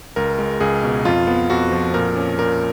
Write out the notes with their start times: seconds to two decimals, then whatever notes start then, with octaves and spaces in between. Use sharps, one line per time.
0.16 C#2 A#4
0.39 G#3
0.60 C#2 G#4
0.84 B2
1.05 F2 F4
1.27 B3
1.50 F2 F#4
1.72 F3
1.94 A#2 A#4
2.16 C#4
2.39 A#2 A#4